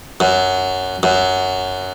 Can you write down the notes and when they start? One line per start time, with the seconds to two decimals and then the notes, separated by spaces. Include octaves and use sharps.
0.20 F#2
1.03 F#2